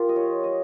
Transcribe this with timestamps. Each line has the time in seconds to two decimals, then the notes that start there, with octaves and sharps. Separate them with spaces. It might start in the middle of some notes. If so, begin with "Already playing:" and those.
Already playing: F4 G4 A#4
0.09 D#5
0.16 F3 C#5
0.44 D#5